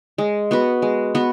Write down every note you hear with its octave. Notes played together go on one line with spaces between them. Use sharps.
G#3
B3 F#4 B4
G#3
B3 F#4 B4